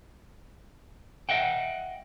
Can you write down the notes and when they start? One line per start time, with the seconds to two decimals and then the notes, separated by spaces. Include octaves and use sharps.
1.29 D#5 E5 F#5 G5